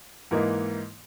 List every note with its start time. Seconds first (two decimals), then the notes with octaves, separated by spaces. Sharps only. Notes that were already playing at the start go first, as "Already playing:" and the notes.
0.31 G#2 E3 A#3 D#4